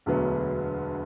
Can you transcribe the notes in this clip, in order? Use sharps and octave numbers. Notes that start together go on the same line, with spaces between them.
E1 D2 D3 F#3 B3